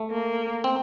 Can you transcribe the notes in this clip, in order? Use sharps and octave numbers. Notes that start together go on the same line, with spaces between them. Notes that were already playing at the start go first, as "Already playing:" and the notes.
Already playing: A3
A#3
C4